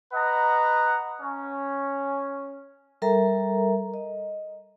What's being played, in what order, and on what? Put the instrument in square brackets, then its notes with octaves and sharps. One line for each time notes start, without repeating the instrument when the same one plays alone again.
[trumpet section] B4 D#5 F#5 A#5
C#4
[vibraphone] G3 A4 A#4 E5 A#5
D#5